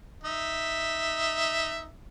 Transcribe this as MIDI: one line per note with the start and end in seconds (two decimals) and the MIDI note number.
0.24 1.89 63
0.24 1.89 76